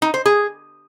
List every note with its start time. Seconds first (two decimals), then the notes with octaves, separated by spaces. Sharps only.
0.02 D#4
0.14 C5
0.26 G#4